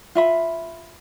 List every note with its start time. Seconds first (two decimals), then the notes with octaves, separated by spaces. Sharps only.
0.15 F4 E5 B5